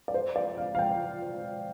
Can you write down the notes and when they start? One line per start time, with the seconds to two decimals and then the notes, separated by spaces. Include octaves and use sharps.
0.08 D5
0.14 C5
0.36 D5
0.57 F5
0.75 F5
0.79 G5